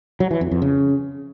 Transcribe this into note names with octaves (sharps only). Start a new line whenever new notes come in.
F#3
E3
F2
F2
C#3